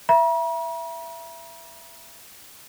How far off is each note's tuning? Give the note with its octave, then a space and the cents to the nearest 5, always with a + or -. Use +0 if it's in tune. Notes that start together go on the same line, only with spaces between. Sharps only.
E5 +20 A#5 +45